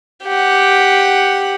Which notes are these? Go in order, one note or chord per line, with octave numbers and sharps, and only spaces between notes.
G4 F#5